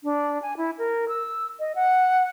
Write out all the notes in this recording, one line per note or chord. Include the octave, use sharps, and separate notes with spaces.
D4
G#5
E4
A#4
E6
D#5
F#5